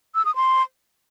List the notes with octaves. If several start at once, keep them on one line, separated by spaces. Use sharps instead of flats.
E6
D#6
C6